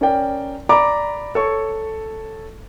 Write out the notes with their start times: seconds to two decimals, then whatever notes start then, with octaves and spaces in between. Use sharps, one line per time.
0.01 C#4 A#4 D5 G5
0.69 D5 A#5 B5 D6
1.35 A4 C#5 C#6